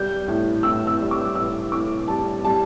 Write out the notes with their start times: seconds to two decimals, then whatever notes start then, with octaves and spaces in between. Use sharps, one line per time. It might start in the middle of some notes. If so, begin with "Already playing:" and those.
Already playing: G3 G6
0.28 A2
0.63 A2 E6
0.87 E6
1.00 G3
1.11 D6
1.35 A2 E6
1.72 A2 D6
2.08 G3 A5
2.45 G3 A5